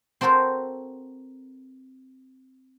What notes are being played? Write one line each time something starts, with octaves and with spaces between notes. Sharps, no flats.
C4 F#4 A4 A#4 C5